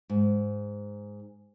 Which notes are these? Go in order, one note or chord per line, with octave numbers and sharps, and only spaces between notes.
G#2